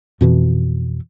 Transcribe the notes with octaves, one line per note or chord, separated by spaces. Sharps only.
F2 B2 E3